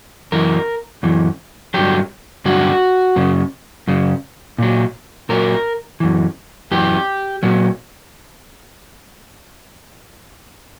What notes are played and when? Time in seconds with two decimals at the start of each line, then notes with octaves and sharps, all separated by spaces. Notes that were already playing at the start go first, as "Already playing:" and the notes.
0.32 F#2 E3 A#4
1.03 F#2 E3
1.74 G2 D3 F#3 G4
2.45 G2 D3 F#3 F#4
3.16 F#2 C#3
3.88 F#2 C#3
4.58 A#2 F#3
5.29 A#2 F#3 A#4
6.00 F#2 E3
6.71 F#2 E3 G4
7.43 A#2 F#3